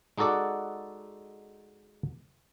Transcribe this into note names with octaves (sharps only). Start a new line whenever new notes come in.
G#3 D#4 F#4 A4 D5 F#5